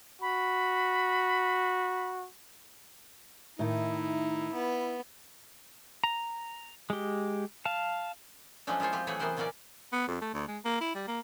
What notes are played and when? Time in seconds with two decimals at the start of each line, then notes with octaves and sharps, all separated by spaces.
0.22 F#4 B5
3.59 A2 D#3 D#4 E4
4.53 B3
6.04 A#5
6.90 G#3 G4
7.65 F5 A5
8.67 F3 F#3 G#3 A3 C#4 D4
8.80 G#3 E4 F4 C5 C#5
8.92 F3 C4 G4
9.07 E3 F#3 A3 G#4 C#5 E5
9.19 C3 E3 B3 A#4 C5 F#5
9.37 A#2 C#3 F#3 C#4 A#4 D5
9.93 B3
10.08 F2
10.21 A3
10.34 D2
10.48 G#3
10.65 A#3
10.81 E4
10.95 G3
11.08 A#3